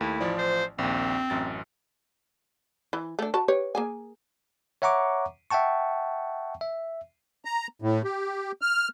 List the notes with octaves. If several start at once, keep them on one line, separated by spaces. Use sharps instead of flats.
D#2 A3 E4
A1 F3 D5
C5
A#1 D#2 C4
A1 F#2 A6
E3
A3 D4
F#4 A5 B5
G4 B4 C#5
A#3 G#4 G#5
C#5 E5 F#5 A#5 C#6 D6
E5 F#5 G5 A5 C#6
E5
A#5
A2
G4
F6